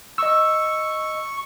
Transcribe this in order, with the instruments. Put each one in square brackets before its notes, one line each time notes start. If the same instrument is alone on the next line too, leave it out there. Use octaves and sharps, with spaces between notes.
[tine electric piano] D#5 E6 [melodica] C#6